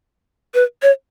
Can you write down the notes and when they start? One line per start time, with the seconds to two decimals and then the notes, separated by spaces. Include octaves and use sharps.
0.54 B4
0.82 C#5